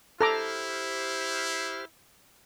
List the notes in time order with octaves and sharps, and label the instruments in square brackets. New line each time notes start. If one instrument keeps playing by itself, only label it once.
[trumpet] E4 [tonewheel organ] G4 C5 F6 [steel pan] A4 A#5 D6